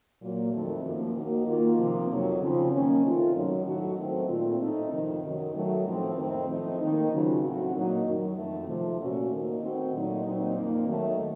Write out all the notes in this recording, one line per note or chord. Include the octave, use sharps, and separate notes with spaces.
A#2 F#3 A#3
F2 D#3 A3
F#2 F3 A#3
D#2 D#3 A#3 D#4 F#4
D#3 A#3 F4
C3 F3 A#3
F2 D#3 F#3
C#3 F3 C4
F#2 D#3 A#3 C#4
C3 D#3 A3 C4 F4
F#2 D#3 F#3
A2 F#3 A3 D#4 F#4
D#3 F#3 A3 C4
A#2 A3 C4 F4
A2 A3 C4 D#4
F2 C3 D#3
F#2 D#3 F#3
D#3 F#3 A3
A2 F3 C4
F2 D#3 A3 C4
A2 F3 A3 C4 D#4
D#3 A#3 D#4
C#3 F#3 C4 F4
A2 F#3 C4 F#4
A#2 F#3 A#3 D#4
F#2 D#3 F#3
F2 D#3 A3
C3 F3 A3
A#2 A3 C#4 F#4
D#2 D#3 A#3 D#4
D#3 A3 C4 F#4
A#2 F#3 A3 D#4
A#2 F#3 C4 D#4
F2 D#3 A#3
D#2 D#3 F#3 A3